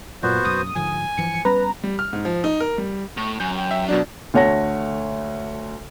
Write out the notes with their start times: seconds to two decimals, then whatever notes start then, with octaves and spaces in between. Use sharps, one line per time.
0.23 F#2 A#2 B3 F#4 C5
0.45 F#1 B1 F#2 D#6
0.75 G#2 D3 F3 G#5
1.17 G2 E3 F3 C#7
1.45 G3 B3 C#4 B4 A#5
1.84 G3
1.99 F6
2.13 G#2
2.25 F3
2.44 D#4
2.60 A#4
2.78 G3
3.17 A2 C#6
3.40 F#2 G#5 G6
3.55 G5
3.71 E5
3.88 B2 F#3 D4 D5
4.34 D2 A3 C#5 F#5 A5 A#6